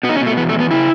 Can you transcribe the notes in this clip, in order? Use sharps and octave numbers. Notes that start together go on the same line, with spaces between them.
B2 B3
D#4
C#4
B2
A3
E2 B3
A3
E2
B3
C#3 E4